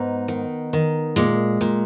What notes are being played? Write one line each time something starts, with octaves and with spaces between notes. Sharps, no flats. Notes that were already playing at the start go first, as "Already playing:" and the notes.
Already playing: G#2 B3 D#4
D#3
D#3
A#2 G#3
A#2